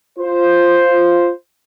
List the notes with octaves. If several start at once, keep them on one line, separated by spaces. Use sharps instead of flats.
F4 C5